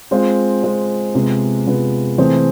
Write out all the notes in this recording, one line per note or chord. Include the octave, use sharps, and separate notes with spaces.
G#3 C4 F4
G#3 C4 F4
C3 G#3 B3 F4
C3 G#3 B3 F4
C3 E3 A3 C4 G#4